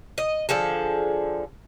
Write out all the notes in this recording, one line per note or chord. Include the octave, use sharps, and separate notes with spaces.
D#5
D3 F3 G#4 A4